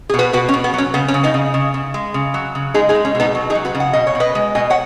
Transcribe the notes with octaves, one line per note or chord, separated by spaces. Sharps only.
G#4
B2
F#4 B4
B2 F#4 B4
C#4
B2
B3
F#3 C#4
C#3 B3
C#4
C#3
B3 D#4
C#3
C#3
C#3
G#3
C#3
F#3
C#3
G#3 D#4 G#4
D#4 G#4
G#3
C#4
B2
B3 D#4
F#3
D#4 G#4
F#3
F#4 B4
C#3
F#5
B2 D#5
C#5
B2
B4 D#5
G#3
B2 D#5 G#5
C#5 F#5